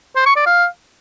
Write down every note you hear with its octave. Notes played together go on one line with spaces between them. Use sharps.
C5
C#6
D5
F5